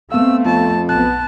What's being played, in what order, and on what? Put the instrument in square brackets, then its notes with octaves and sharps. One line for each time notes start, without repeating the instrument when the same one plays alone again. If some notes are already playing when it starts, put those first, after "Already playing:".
[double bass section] A3 C4 [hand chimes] B3 F5 [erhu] E6
[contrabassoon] F2 [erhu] A5
[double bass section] B1 B3 [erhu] A5 [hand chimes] F#6